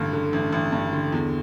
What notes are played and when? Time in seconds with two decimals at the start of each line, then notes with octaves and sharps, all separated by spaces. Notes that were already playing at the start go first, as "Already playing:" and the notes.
Already playing: A1 G2 D3
0.13 D3
0.33 A1
0.52 A1
0.73 G2
0.93 D3
1.12 E2